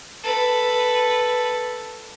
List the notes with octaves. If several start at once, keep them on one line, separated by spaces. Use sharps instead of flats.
A4 B4